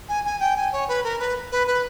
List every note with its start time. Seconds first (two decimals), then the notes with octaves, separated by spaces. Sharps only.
0.09 G#5
0.24 G#5
0.40 G5
0.56 G#5
0.72 C#5
0.88 B4
1.04 A#4
1.19 B4
1.52 B4
1.67 B4